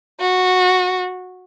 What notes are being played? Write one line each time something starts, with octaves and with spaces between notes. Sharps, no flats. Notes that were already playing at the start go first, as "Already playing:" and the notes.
F#4